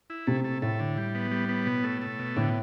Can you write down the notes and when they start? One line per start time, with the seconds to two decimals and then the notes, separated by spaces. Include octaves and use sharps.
0.10 E4
0.27 C3 A3
0.44 A3
0.62 A2 A3
0.80 D3
0.97 G3
1.15 B3
1.31 G3
1.49 B3
1.66 B2
1.84 A3
2.02 A3
2.19 B2
2.36 A2 D3